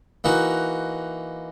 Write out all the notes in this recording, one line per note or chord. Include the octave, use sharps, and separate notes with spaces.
E3 A#3 D#4 F#4